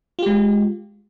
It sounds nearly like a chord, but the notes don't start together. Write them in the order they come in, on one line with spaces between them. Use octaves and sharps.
F4 G4 G#3